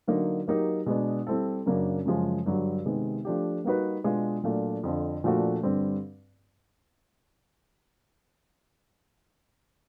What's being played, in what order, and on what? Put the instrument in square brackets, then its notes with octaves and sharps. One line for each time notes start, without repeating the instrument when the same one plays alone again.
[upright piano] D3 F#3 A#3 D#4
F#3 A#3 D#4 G4 A#4
B2 G#3 B3 D4
G3 C4 E4 A4
F#2 C#3 F#3 A#3 D4
F#2 C#3 F3 G#3
G2 D3 F#3
C3 D#3 G#3 B3
F3 A3 D4 G4
G3 A#3 D#4 F#4 B4
B2 G#3 B3 D4 F4
A#2 F#3 A3 D4 F4
F2 D3 F3
A#2 F3 A3 D4 F#4
G2 D3 G3 C4